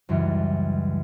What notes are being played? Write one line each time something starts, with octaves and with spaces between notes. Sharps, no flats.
C#2 F#2 E3 G3